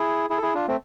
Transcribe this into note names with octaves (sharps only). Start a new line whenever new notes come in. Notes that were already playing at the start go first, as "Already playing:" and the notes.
Already playing: E4 G#4
E4 G#4
A4
E4 G#4
D4 F4
A3 C4